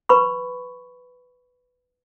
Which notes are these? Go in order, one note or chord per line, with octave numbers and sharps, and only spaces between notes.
B4 B5 C#6